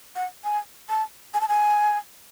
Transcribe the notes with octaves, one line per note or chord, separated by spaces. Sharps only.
F#5
G#5
A5
G#5
A5
G#5